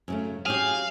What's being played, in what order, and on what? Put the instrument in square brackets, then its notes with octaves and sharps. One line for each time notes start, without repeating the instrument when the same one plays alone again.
[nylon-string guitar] F#2 C#3 A3
[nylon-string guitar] F#3 C#4 G4 [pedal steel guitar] G#4 [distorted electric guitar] F5